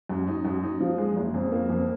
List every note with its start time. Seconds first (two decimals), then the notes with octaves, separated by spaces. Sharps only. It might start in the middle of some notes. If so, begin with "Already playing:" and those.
0.09 F#2
0.27 D#4
0.45 F#2
0.63 D#4
0.80 F3
0.98 G#3
1.16 F#1
1.34 F2
1.52 A#3
1.69 F2